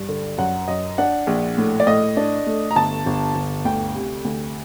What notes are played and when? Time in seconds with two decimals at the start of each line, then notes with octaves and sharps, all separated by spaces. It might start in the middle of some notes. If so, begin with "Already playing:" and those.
Already playing: G2
0.09 D3
0.38 F#2 F#5
0.68 F#2 D#5
0.98 D4 F#5
1.27 A#1
1.58 A2
1.80 D5
1.87 A2 D#5
2.17 D4
2.46 A3
2.71 A#5
2.76 G1 A5
3.06 G1
3.35 G1
3.65 D2 G5
3.95 C3
4.25 D2